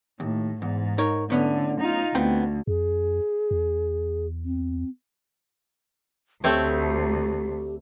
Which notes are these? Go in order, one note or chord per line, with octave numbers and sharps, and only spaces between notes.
D#2 A2
E2 G#2
D#4 A#4 C#5
A2 D3 B3 C#4
D#4 F4
D2 B3 C4 G5
F2 G#4
E2
C4
D2 A3 C4 G4 C#5